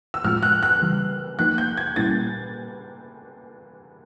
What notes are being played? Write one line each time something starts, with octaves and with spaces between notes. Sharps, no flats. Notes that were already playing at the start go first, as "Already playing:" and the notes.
E6
A2 F3 G#3 C4 F4 F6
F#6
F#6
C#3 E3 G3
F3 A#3 D#4 F#6
G6
G#6
A#2 G3 A#3 C#4 E4 A6